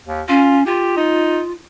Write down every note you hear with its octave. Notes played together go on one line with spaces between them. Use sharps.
D#2
C#4 F4
F4 G4
D#4